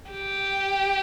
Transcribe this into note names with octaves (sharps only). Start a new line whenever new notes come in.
G4